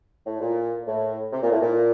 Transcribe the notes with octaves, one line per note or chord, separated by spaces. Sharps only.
A2
A#2
A2
C3
A#2
A2
A#2